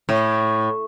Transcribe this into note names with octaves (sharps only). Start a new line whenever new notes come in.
A2